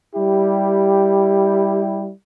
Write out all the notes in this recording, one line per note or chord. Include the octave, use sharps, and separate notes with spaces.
G3 E4 G4